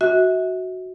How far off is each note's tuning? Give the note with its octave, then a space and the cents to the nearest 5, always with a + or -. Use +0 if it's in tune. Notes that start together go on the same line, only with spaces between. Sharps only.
F#4 +0 E5 -35